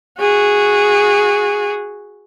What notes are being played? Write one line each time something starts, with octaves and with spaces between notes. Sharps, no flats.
F#4 G#4